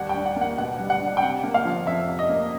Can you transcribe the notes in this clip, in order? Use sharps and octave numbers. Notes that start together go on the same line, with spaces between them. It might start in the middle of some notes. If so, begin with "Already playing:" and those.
Already playing: D#2 G3 F#5
G5
D4
F#5
A#3
F#5
B2 F#5
G3
F#5
D4
G5
C3 F#5
A#3
F5
F3
F2 E5
C3
D#5
A#3